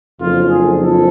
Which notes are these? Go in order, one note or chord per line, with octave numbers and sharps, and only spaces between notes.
F#1 F2 D3 F3 F4
G#4
A4